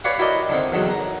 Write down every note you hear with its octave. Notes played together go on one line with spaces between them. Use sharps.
G4 B4 C#5 D5 F5 F#5
E4 F#4 G4 A#4 D5 D#5
D3 D#3 C4
E2 D3 D#3 F#3
A#5